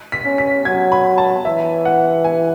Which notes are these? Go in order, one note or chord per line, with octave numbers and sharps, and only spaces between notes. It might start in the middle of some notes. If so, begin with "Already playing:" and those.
B6
C#4
B6
F#3 G#6
B5
A5
E3 E5
F#5
G#5